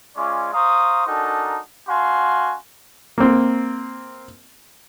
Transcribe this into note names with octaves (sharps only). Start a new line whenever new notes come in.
G#3 C#4 F4 D5 C#6 D6
C5 F5 A#5 C#6 D#6
D4 D#4 F#4 A4 A#4 G#5
D4 F#4 F5 G#5 C6
A#3 C4